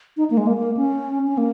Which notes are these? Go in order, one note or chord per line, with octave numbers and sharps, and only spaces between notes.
D#4
A#3
G#3
A#3
A#3
C#4
C#4
A#3